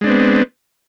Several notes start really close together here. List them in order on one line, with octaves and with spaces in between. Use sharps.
G#3 D4 C4 B3